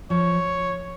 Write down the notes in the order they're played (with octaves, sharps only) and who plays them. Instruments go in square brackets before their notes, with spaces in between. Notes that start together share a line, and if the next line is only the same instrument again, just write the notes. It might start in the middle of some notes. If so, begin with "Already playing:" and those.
[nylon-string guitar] F3 [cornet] C#5